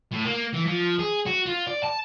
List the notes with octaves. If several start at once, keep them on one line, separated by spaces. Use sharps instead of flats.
A2
A#3
E3
F3
G#4
F#4
F4
D5
A5